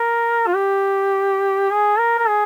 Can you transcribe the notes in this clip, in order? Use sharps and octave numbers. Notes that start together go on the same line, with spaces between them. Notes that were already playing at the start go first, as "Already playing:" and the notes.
Already playing: A#4
F4
G4
G#4
A#4
A#4
G#4